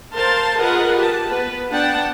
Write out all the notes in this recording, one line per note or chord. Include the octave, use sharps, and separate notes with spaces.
A#4 C5 F5 A5 C6
F4 G#4 A#4 B4 D#5 F#5
G4 A5
B3 B4
B3 D4 F#5 G5 A5